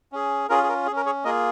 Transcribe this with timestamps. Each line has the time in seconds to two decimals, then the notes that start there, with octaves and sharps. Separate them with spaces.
0.12 C#4 G#4
0.49 C#4 F4 G#4 A#4
0.63 G#4
0.69 A#4
0.87 G#4
0.91 C#4
0.96 A#4
1.06 G#4 C#5
1.24 A#3 F4 G#4 A#4 D#5